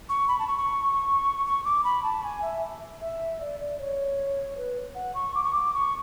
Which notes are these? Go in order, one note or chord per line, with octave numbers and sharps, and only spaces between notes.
C#6
B5
A5
C#6
C#6
C#6
D6
B5
A5
G#5
E5
E5
D5
D5
C#5
B4
F#5
C#6
D6
C#6
D6
C#6